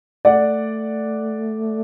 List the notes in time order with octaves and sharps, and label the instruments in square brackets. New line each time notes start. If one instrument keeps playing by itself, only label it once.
[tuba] A3 [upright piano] D5 F#5